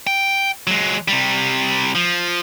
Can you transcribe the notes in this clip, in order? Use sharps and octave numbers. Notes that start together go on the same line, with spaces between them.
G5
F#3 G#3
C3 G3
F3